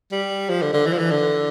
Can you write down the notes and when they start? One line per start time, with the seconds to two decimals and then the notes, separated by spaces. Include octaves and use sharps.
0.12 G3
0.49 F3
0.62 D3
0.73 D3
0.87 E3
0.93 F3
0.99 E3
1.11 D3